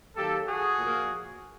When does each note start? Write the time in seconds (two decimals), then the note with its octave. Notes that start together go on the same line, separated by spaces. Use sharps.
0.15 D#3 F#3 A#3 G4 A4
0.47 F#4 G#4
0.79 A#2 F3 A#3